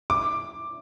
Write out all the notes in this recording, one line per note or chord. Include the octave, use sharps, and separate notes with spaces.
D6